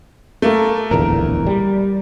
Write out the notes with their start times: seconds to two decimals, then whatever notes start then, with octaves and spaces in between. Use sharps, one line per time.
0.42 A3 A#3
0.91 D1 A#1 E2 A#4
1.47 G3